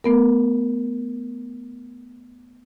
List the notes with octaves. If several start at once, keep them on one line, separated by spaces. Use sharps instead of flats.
A3 B3 A#4